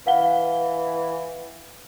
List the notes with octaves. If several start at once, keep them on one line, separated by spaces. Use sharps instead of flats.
E3 F5 F#5 G7